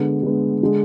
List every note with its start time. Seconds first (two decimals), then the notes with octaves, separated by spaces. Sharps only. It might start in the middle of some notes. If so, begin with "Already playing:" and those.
Already playing: D3 G#3 B3
0.23 D3 G#3 B3
0.63 D3 G#3